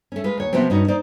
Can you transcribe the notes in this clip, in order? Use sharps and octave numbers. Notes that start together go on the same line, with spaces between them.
A3 C#4
G#3 F4 B4
D#2 C#5
C3 F3 F#3 B3 C4
G2 C#4 D#4 F#4
D#4 C5 D5